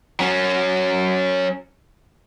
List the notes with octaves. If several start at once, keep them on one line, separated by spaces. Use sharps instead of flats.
F#3 C#4